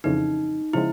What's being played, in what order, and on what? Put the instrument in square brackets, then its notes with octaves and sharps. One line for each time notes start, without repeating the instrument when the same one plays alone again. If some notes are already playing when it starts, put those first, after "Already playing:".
[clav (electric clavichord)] F2 C#3 E3 [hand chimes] D#4
[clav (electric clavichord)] C#3 F3 G#3 [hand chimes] E4